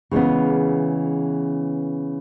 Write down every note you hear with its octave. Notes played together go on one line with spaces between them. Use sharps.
C#3 E3 G#3 B3